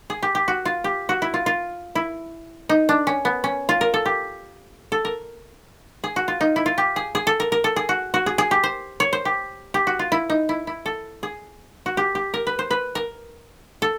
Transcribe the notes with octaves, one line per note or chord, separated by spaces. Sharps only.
G#4
G4
G4
F#4
F4
G4
F#4
E4
F4
F4
E4
D#4
D4
C#4
B3
C#4
F4
A#4
A4
G4
A4
A#4
G#4
F#4
F4
D#4
E4
F4
G4
G#4
G#4
A4
A#4
A#4
A4
G#4
F#4
F#4
G#4
G#4
G4
C5
C#5
C5
G4
G4
F#4
F4
E4
D#4
E4
E4
A4
G#4
F#4
G4
G4
A#4
B4
C5
B4
A#4
A4